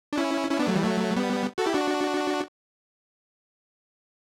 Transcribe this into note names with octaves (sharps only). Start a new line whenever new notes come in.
D4
C#4 E4
C#4 E4
B3 D4
F#3 A3
E3 G3
F#3 A3
G3 B3
F#4 A4
E4 G4
D4 F#4